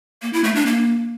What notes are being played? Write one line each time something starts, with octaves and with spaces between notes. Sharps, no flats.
A#3
E4
A3
D4
A#3